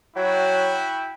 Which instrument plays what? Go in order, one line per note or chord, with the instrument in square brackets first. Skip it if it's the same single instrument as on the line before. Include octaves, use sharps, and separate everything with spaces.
[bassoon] F#3 [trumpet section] E4 F#4 G5